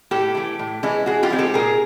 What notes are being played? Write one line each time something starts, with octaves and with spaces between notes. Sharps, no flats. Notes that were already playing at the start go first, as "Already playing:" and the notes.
A2 G4 A4
E3 A3
A2
E3 G#3 C#4 E4
E3 F#4 G#4
F4 G4
G#3 C4 D#4
G4 A4
A#2 G#4 A#4